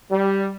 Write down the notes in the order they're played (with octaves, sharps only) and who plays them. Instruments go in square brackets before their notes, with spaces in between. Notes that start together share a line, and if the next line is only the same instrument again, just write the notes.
[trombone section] G3